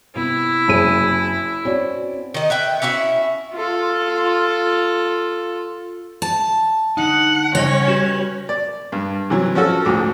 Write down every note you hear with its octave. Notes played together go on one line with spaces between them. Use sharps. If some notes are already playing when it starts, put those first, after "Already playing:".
C3 B3 E4
F#1 G#4 D#7
C4 C#4 F#4 D5
D#3 D#5
B4 E5 G5
C#4 E4 F#4 E5
F4 A4
A5
D3 D#4 F#5
C#3 G3 C#4 C#5 D#5
F#4 G4 B4
D5
G2
C3 E3 F#3
F3 C#4 F#4 A4
D2 G#2 D6